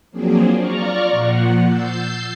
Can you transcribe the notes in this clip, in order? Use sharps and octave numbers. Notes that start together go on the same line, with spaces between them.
F3 F#3 A#3 C4 D4 G#4
F4 D5 A#5 C#6 F6
A#2 F3 F#5
E6 G6 A6 C7